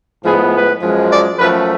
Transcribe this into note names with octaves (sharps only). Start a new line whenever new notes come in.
A2 F3 G#3 B3 G#4
B4
F#2 F3 G#3
D5
F#2 F3 A3 B4